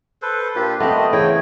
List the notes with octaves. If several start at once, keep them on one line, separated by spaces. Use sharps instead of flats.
A4 B4 C5
A#2 D4 F4 G4
A3 B3 C4 D#5
C#3 E3 C#5 G5